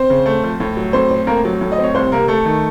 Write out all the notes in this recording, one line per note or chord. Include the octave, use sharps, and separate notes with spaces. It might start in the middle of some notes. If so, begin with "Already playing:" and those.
Already playing: C4 C5
C#3
A3
F3
A2
F#3
A2 C4 C5
C4
A2 A#3 A#4
F#3
A2
D#5
C4
C#5
C2 C4 C5
C3 A#3 A#4
A3 A4
D#3